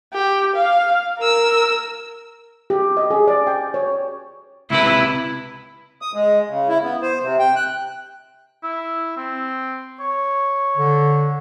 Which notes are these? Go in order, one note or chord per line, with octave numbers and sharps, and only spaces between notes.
G4
F5
A#4 E6
G4
D#5
G#4
D5
G5
C#5
C#2 C3 E4 B4
D#6
G#3
C#3
E4
B3
C5
C3
G5
F#6
E4
C4
C#5
D3